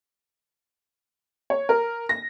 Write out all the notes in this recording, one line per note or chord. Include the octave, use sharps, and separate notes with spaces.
C#5
A#4
A#6